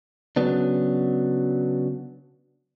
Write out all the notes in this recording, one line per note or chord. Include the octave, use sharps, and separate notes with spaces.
C#3 F#3 B3 D4